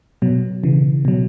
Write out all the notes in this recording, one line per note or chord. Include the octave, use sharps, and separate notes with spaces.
B2 F#3
C#3 E3
B2 F#3